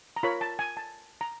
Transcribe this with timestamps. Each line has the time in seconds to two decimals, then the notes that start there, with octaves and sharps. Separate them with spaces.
0.16 A#5
0.23 F4 A#4 C#5 B5
0.41 A5
0.59 G#5
0.77 A5
1.21 A#5